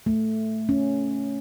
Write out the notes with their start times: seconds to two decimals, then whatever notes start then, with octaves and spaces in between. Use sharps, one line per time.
0.06 A3
0.69 C#4